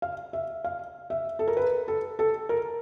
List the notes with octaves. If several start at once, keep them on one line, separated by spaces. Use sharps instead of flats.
F5
E5
F5
E5
A4
A#4
B4
A4
A4
A#4